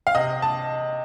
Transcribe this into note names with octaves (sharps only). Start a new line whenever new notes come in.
F5
C3 D#5
A5